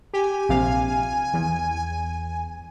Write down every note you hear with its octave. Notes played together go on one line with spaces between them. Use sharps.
G4 G#5
A#1 C3 F5
E2